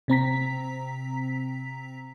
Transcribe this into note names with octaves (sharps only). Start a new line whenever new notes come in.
C3 C4 A#5 B6